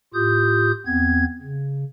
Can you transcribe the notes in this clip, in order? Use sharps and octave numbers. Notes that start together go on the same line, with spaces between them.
A2 F4 G4 D#6 G6
E2 B3 C4 G#6
C#3